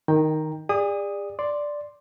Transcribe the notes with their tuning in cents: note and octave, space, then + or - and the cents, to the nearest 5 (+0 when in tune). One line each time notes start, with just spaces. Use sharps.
D#3 +0 G5 +15 A#5 +0
G#4 -40 D5 +10 D#6 +0
D5 +0 C6 +0